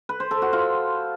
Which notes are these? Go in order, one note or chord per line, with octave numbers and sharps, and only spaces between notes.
B4
C5
A4
F#4
F4